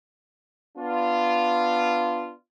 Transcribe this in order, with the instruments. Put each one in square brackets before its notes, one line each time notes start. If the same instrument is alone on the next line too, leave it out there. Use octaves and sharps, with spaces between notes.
[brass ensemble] B3 D4 F4